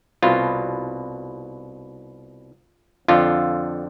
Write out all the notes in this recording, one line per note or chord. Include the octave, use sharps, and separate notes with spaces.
C2 B2 F4
F2 D3 F3 F4